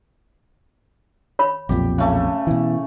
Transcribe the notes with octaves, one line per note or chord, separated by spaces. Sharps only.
C#5 B5
B1 F2 A#2 G4 G5
C#3 A3 G#5
B2 E3